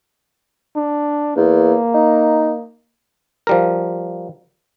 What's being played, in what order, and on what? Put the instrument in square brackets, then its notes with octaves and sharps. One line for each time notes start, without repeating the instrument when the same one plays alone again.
[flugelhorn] D4
[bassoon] E2 [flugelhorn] A#3
[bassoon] D#4
[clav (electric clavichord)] F3 G3 A#4